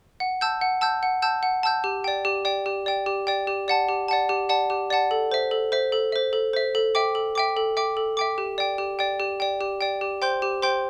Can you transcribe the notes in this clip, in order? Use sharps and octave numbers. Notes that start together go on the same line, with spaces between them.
F#5
A5 E6 G6
F#5
A5 E6 G6
F#5
A5 E6 G6
F#5
A5 E6 G6
G4
D5 G5
G4
D5 G5
G4
D5 G5
G4
D5 G5
G4
D5 F#5 A5
G4
D5 F#5 A5
G4
D5 F#5 A5
G4
D5 F#5 A5
A4
C5 E5
A4
C5 E5
A4
C5 E5
A4
C5 E5
A4
E5 G5 D6
A4
E5 G5 D6
A4
E5 G5 D6
A4
E5 G5 D6
G4
D5 G5
G4
D5 G5
G4
D5 G5
G4
D5 G5
G4
C5 G5 C6 G6
G4
C5 G5 C6 G6